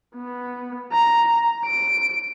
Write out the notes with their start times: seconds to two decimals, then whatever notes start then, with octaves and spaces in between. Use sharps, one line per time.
0.15 B3
0.92 A#5
1.66 D7